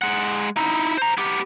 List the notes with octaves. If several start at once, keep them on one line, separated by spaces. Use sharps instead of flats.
G#3 F#5
D#4 E4
C5 A#5
B3 G4